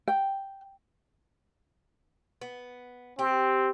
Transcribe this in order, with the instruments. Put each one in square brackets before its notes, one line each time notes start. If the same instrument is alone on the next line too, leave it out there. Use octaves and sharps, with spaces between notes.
[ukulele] G5
[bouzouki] B3
[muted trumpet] C4 [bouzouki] G4